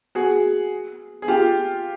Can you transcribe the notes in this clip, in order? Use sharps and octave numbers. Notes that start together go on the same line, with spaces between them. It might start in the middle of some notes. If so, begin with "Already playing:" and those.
F#4 G#4
G#4
F4 G4